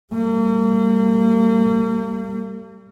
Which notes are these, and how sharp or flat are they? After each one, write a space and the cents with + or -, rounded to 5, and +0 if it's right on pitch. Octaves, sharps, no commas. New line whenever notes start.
G3 +0 A#3 -40